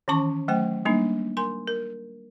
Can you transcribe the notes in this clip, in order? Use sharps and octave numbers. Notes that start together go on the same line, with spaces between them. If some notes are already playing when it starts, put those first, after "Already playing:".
D#3 E3 C#4 A5 C#6
F#3 A3 C5 G5
G3 A#3 D4 D#4
A#4 G#5 C6
A#4